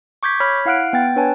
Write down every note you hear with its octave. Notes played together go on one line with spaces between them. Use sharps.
C#6 D6 G6 G#6 B6
C#5 B5 F6 G#6 B6
E4 F5 F#5 F6 F#6 D7
B3 G5 A6
D4 B4 C#5 G#5 A5